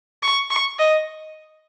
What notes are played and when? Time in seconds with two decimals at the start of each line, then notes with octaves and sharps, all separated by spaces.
0.23 C#6
0.50 C#6
0.79 D#5